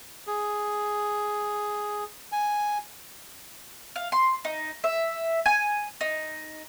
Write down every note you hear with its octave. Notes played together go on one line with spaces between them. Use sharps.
G#4
G#5
F5
C6
D#4
E5
G#5
D#4